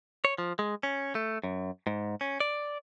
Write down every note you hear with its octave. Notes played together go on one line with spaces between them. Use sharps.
C#5
F3
G#3
C#4
A3
F#2
G#2
C#4
D5